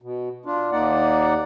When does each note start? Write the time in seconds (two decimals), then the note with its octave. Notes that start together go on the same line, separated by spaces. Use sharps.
0.02 B2
0.46 D4 F4
0.72 D#2 A#3 D#4 D5 F#5